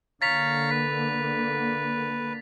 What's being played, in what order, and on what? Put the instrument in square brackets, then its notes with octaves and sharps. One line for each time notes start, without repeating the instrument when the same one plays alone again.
[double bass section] D3 A#3 [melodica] C#5 F5 A#5 [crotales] A6 B6 F7
[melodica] B4 [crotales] B6